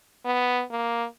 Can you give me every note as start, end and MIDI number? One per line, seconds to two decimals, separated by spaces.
0.25 0.62 59
0.71 1.05 58